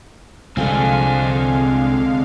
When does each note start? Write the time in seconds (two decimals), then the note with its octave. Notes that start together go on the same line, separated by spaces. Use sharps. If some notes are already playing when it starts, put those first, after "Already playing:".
0.57 C2 D3 F3 G#3 C4 A4 F5 G#5